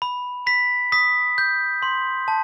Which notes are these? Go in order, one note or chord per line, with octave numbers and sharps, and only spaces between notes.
B5
B5 B6
D#6 B6
G6
C6
A5